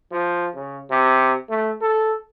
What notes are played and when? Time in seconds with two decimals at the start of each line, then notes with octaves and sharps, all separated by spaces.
0.12 F3
0.55 C#3
0.90 C3
1.50 A3
1.81 A4